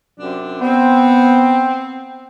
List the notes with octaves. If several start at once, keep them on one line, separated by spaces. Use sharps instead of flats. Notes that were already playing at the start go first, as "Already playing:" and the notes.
F#2 C3 D4
B3 C4